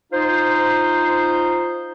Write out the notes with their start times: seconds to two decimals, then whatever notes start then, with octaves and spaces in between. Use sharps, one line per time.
0.13 D#4 F4 C5